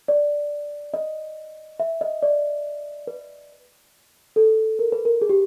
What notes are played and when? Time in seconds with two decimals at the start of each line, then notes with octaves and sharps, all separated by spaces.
0.08 D5
0.94 D#5
1.80 E5
2.01 D#5
2.23 D5
3.07 B4
4.36 A4
4.79 A#4
4.92 B4
5.05 A#4
5.21 G#4
5.29 G4